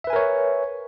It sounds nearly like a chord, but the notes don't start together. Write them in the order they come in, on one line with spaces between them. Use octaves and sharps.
E5 B4 G#5 A#4 C#5